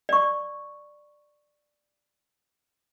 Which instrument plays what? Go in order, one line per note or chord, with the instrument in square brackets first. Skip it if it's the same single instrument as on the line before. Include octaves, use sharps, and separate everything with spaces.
[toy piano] D5 C#6